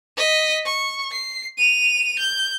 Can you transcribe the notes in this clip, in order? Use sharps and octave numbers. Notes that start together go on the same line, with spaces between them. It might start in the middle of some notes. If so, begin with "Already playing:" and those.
D#5 B6
C#6
C7
D#7 F7
G6